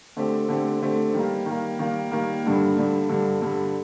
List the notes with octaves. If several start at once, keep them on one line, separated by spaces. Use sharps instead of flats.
D3 A3 C4 G4
D3 A3 C4 G4
D3 A3 C4 G4
D#3 G3 A#3
D#3 G3 A#3
D#3 G3 A#3
D#3 G3 A#3
G2 D3 G3
G2 D3 G3
G2 D3 G3
G2 D3 G3